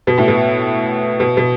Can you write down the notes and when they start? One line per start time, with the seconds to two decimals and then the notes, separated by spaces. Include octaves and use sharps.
0.07 B2
0.18 A2
0.28 B2
1.20 B2
1.37 B2